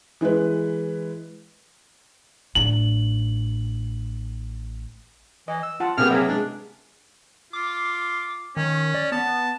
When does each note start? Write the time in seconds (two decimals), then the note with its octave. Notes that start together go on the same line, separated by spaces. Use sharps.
0.21 E3 G#3 B4
2.55 A1 D4 F#7
5.48 E3 D#5
5.63 E6
5.80 F4 F#5 A5
5.98 C3 A#3 B3 G4 G#4 F6
6.10 F#3 G#4 A#4 E5
6.29 G#3 D4
7.53 F4 D6
8.57 D#3 C#4
8.94 D5
9.12 B3 A5
9.27 B3